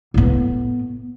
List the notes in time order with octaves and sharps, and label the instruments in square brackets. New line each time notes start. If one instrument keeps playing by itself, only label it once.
[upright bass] A2 B3